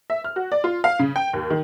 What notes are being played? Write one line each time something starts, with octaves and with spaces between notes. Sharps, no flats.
E5
F6
F#4
D5
F4
F5
C#3
G5
D#2
D#3